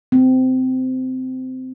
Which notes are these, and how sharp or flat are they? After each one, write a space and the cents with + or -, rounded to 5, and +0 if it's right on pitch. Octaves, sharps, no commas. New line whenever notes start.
C4 -20